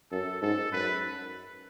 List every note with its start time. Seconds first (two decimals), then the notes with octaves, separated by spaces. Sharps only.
0.11 F#2 A4
0.42 G#2 A4
0.72 F#2 B4